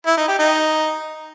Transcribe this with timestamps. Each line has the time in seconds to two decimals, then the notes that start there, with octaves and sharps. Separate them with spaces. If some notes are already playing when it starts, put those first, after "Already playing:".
0.06 E4
0.17 D#4
0.28 G4
0.39 D#4